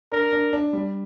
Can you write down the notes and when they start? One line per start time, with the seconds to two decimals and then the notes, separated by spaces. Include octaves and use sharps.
0.12 D4 A#4
0.33 D4
0.53 D4
0.73 G3